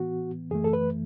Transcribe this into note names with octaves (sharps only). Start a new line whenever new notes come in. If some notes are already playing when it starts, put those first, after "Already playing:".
Already playing: A2 E3 B3 F#4
F#2 E3 A3 G#4
A4
B4